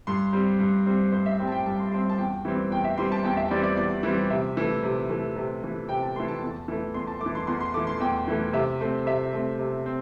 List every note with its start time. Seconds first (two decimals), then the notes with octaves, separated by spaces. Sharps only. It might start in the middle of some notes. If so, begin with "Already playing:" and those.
0.07 G2 C6
0.33 G3 C4
0.59 G2
0.86 G3 C4
1.12 G2 C5
1.26 E5
1.39 G3 C4 G5
1.47 A5
1.52 G5
1.66 G2 A5
1.79 C6
1.91 G3 C4 C6
2.09 A5
2.18 E2 G5
2.45 E3 G3 C4
2.71 E2 G5
2.84 E5
2.98 E3 G3 C4 C6
3.12 A5
3.24 E2 G5
3.37 E5
3.51 E3 G3 C4 D5
3.63 D5
3.77 E2 D5
4.03 E3 G3 C4
4.30 C3 E5
4.57 E3 A3
4.83 C3
5.10 E3 A3
5.36 C3
5.62 E3 A3
5.89 C3 G5
6.03 A5
6.16 E3 A3 C6
6.28 A5
6.42 E2
6.68 E3 A3
6.94 E2 C6
7.07 A5
7.21 A3 D6
7.26 E3
7.35 C6
7.47 E2 C6
7.60 C6
7.74 E3 A3 D6
7.87 C6
8.00 E2 G5
8.28 E3 A3
8.53 C3 E5
8.81 A3 C4
9.06 C3 E5
9.33 A3 C4
9.59 C3
9.86 C4